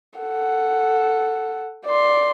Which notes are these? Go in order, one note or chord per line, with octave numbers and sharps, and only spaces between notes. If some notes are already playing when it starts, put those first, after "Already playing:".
A4 F#5
D5 C6